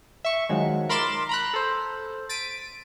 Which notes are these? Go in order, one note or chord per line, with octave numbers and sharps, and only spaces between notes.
E5 C#6
D#3 F3 F#3 G#3
A#4 B5 C6 D6 A6 E7
A#5 B5 F#6
A4 C5
A6 B6 D7 D#7